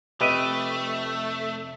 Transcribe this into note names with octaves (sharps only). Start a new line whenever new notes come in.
F1 F2 A3 G4 B4 D#5 E5